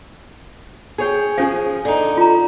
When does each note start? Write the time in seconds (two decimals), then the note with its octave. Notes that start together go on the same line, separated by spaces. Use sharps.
0.98 G#4 C#5 G5
1.38 F3 C#4 G#4 F5
1.85 D3 D#4
2.17 F4 A#5